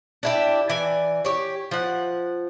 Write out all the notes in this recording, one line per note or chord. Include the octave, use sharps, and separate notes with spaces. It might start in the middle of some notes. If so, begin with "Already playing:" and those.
D4 E4 G4
E3 D5 G#5
G4 C#5
F3 F#5